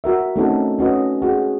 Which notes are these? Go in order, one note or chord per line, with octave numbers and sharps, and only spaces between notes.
F#4 A#4 E5
A3 C4 C#4 D#4 F#4 A4
C#4 F#4 B4 D#5
F#4 G#4